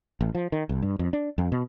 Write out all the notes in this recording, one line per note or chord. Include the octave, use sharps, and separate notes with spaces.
A1
F3
D#3
C2
G2
F2
D4
F2
B2